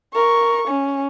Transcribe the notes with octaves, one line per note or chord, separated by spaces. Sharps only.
A#4 C#6
C#4